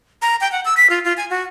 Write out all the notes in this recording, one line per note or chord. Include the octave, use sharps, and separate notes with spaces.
A#5
G5
F#5
E6
B6
F4
F4
G#5
F#4